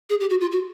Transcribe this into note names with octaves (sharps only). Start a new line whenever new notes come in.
G#4
G4
F#4
F4
F#4